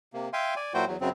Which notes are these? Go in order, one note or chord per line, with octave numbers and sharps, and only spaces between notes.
C3 A#3
E5 F5 G5 G#5 C6
D5 G#5
A#2 F#3 E4 F#4 C5 G5
E2 F#3
F#2 C#3 F#3 C4